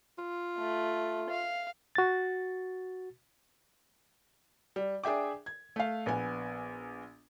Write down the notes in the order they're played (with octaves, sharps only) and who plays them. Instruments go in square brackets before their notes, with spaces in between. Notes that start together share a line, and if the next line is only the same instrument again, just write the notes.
[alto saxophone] F4
[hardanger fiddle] A3
F5
[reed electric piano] F#4 A6
[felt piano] G3
D4 G#4 E5 G5 D6
G#6
A3 F5
A#1 B3 G#5